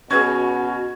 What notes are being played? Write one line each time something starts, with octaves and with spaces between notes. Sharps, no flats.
B2 C#4 F#4 G#4 B4 C#6 G#6